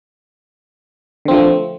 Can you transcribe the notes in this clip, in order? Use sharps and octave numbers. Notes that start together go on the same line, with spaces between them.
D3 F3 A3 C4